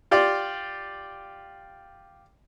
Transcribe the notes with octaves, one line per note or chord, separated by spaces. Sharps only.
F4 G4 D5